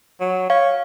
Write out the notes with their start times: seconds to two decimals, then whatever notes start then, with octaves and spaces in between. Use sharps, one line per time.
0.20 F#3
0.50 C#5 F5